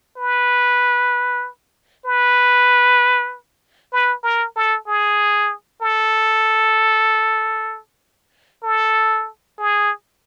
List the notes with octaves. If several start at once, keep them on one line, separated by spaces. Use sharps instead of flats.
B4
B4
B4
A#4
A4
G#4
A4
A4
G#4